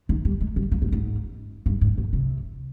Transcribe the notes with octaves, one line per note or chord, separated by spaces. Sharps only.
D#3
G3
G#3
G3
F3
G#2
G#2
G2
G#2
A#2
C3